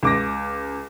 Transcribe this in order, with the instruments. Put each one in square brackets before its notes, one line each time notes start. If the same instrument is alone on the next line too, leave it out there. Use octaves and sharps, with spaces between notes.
[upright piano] C#2 D6 A#6